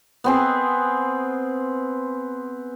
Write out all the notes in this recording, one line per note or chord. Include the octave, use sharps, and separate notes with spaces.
B3 C4 G#4